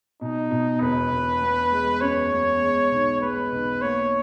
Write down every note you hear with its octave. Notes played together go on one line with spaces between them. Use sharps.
B2 D#4
B2
E1 B4
E1
B3
G#3
F#2 C#5
B3
G#3
B1
G#3 B4
B1
A#3 C#5